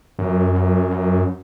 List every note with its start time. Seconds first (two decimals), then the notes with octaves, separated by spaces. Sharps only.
0.19 F#2